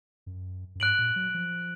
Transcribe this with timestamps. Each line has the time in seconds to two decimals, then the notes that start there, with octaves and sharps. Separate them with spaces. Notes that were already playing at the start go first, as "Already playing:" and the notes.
0.26 F#2
0.75 F#2
0.80 G#2 F#6 D7 F#7
0.98 A#2
1.16 F#3
1.34 F3